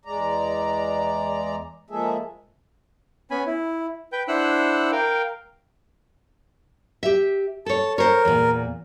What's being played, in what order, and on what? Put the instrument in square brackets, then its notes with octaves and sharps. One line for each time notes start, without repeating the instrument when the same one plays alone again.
[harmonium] E2 G#3 D5 A#5
F3 G#3 A#3 G#4 A4 E5
[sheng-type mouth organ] B3 C#4 G#5 B5
E4
B4 G5 G6
D4 E4 C5 F#5 E6 F#6
A#4 F5 G5
[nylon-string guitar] G4 E5
[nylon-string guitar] A4 C#5 [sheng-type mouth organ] A5
[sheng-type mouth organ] A#4 [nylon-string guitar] C5 C#5
[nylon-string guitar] E2 A#2